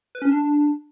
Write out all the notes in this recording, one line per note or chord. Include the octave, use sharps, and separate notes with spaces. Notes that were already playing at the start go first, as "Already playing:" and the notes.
B4
C#4
D4